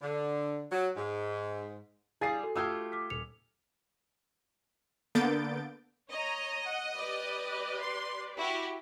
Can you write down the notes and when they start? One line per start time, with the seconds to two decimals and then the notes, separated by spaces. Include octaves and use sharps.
0.02 D3
0.72 F#3
0.97 G#2
2.21 G3 E4 G#4 F5 G#5 D#6 A6 C7
2.43 F#4 A4
2.55 A3 F4 G4 D#6 E6 G#6
2.92 D6 F6 B6
3.10 D#1 C#7 F7
5.15 D3 A#3 B3 G6 A6 D7
6.11 C#5 D#5 A#5
6.65 F#5
6.95 G4 B4 D5
7.81 C6
8.38 E4 F#4 G4